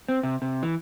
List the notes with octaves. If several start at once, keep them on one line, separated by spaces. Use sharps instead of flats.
C4
C3
C3
E3